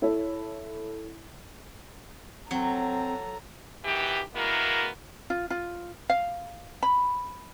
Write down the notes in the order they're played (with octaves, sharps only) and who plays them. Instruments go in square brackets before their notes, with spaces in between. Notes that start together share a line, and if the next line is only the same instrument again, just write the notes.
[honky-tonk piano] E4 A4 C#5
[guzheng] F#3 [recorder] C4 [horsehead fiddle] A4 A#5
[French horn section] B2 D#3 E3 G4
G#3 A#3 B3 E4 F#4 A#4
[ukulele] F4
F4
F5
B5